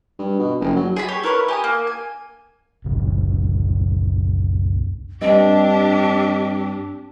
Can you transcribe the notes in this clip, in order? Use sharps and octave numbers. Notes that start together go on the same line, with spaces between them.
G2
B2
F#1
F#3
G#4 G#5 A5 B5
G4 C#5
E4 A#4 B4 C#5
G4 G#5 D#6
A#3
G#5
F#1 C2
G2 C4 D4 G4 D#5